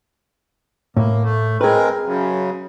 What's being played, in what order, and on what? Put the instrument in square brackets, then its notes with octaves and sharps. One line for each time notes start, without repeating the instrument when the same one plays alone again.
[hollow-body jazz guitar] A2 [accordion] A#3
[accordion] A3
[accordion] G#3 C4 A#4 [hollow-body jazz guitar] G#4 B4
[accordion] F#2 C#3